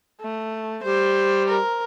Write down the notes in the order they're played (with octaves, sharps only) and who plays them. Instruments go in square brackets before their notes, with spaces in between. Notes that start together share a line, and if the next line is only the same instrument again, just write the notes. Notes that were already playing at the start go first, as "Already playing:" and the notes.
[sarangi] A3
[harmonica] G3 [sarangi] C5
[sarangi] A#4